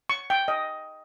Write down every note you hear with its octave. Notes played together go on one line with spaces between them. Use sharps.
C#6
G5
D#5